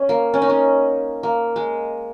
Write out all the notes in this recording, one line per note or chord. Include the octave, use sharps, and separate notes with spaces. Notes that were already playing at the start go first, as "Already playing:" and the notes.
Already playing: C#4
A#3
C#4
D#4
C#4
A#3
G#3